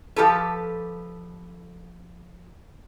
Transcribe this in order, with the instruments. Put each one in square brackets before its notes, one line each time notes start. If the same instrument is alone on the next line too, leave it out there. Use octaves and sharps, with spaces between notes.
[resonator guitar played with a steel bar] F3 G4 A4 B4